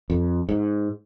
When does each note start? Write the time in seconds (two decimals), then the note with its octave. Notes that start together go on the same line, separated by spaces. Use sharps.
0.10 F2
0.49 G#2